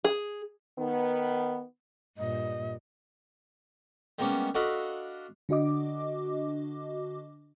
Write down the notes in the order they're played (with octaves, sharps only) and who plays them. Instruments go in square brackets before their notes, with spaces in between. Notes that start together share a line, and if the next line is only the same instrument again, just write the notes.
[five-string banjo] G#4
[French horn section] D#3 B3
[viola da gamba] G2 A#2 [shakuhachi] D#5
[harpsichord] G3 G#3 A#3 B3 C#4
D4 F#4 A4 D#5 F5 B5
[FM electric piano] D3 D4 F#4 D#5 D6